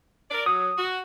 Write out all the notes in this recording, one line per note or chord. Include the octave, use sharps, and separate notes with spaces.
A#4 D5
F#3 D#6
F#4